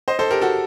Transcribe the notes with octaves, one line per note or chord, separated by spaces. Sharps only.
C5 D#5
A4 C5
G4 A#4
F#4 A4